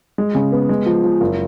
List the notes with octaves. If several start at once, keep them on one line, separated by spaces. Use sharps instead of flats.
G#3
C#3
B3
G#3
F3
F3
F#1